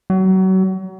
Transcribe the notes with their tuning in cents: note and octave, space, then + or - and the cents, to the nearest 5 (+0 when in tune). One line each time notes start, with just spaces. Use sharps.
F#3 +30